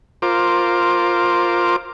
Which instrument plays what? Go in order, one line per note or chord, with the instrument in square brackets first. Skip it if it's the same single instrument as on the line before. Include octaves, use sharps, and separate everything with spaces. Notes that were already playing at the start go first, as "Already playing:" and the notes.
[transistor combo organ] F4 A#4 C5 D6